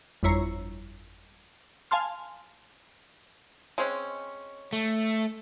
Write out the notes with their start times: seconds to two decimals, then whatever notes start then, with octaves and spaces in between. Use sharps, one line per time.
0.23 G1 F2 E4 C#5 A#5 C7
1.91 F5 G#5 A5 C6 F6
3.78 G#3 C4 C#4
4.73 A3